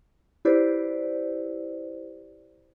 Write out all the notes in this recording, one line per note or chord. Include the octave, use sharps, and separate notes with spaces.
E4 G4 B4 C5 D5